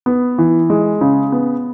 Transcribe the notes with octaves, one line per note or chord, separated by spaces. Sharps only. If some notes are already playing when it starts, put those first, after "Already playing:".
B3
E3
G#3
C#3
B3